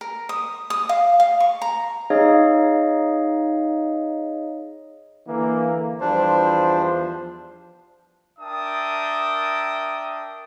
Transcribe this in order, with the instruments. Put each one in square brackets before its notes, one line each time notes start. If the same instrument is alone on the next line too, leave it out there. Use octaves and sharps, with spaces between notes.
[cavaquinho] A#4
D#6
D#6
F5
F5
C#6
A#5
[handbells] D#4 G#4 C#5 D#5 F5
[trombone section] D3 E3 A#3
[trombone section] E2 F3 C5 [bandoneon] G3 D4
[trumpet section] D4 A#4 E5 G5 A5 D#6